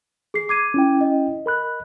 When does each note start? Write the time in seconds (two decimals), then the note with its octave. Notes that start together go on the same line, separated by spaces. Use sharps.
0.34 G#4 C7
0.49 D6 G#6 D#7
0.74 C#4 E4 G5
1.01 D#5
1.46 A#4 B5 F#6